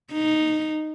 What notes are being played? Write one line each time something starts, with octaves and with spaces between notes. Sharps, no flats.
D#4